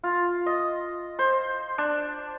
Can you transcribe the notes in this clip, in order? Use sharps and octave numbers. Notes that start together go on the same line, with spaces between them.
F4
D#5
C5
D4